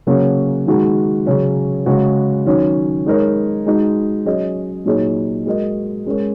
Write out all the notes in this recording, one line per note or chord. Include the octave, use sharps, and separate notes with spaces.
C#3 F#3 A#3 C#4 F#4
D#3 G#3 F#4
C#3 F#3 C#4
C#3 G#3 F#4
D#3 F#3 C#4
G#3 D#4 A#4 C#5
G#3 D#4 F#4
F#3 C#4 G#4 D#5
A#2 F#3 D#4 G#4 C#5
G#3 F#4 A#4 D#5
G#3 C#4 A#4 C#5